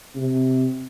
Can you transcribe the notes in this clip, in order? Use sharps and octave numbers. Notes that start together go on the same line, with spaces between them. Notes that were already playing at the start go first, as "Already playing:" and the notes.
C3